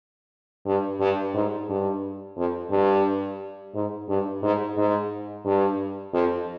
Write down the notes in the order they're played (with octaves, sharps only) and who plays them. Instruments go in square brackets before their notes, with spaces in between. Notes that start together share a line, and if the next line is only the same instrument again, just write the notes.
[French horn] G2
G2
G#2
G2
F2
G2
G#2
G2
G#2
G#2
G2
F2